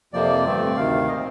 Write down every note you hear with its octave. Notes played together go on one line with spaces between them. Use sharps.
F2 C3 F3 A#3 D5
G2 D3 A3 C4
D2 C3 D#3 F5
A#2 F3 C4 D#5